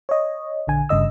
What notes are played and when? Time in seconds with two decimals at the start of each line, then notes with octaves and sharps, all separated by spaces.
0.09 C#5 D#5
0.67 A#1 D3 G#5
0.89 G1 G2 C#3 D#5 E6